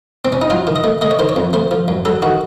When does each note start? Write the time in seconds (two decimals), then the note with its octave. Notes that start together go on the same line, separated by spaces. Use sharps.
0.25 C4
0.32 C#4
0.42 D#4
0.50 F#3 F4
0.67 D#3
0.76 D#5
0.84 A3
1.01 A3 D#5
1.11 C#5
1.19 D#3 C5
1.29 C#5
1.36 F2
1.53 A3 C5
1.71 F3
1.88 F#2
2.05 F#3 A4
2.22 D#3 F#4